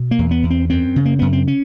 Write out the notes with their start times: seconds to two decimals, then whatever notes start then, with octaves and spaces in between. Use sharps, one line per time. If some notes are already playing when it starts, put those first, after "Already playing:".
Already playing: B2
0.11 A#3
0.19 E2
0.31 B3
0.43 E2
0.50 C4
0.70 F#2 C4
0.96 C#3
1.06 A#3
1.19 F#2 B3
1.33 C4
1.48 C#4